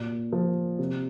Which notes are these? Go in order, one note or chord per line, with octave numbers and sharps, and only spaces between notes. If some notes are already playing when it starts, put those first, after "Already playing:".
Already playing: A#2
F3
C3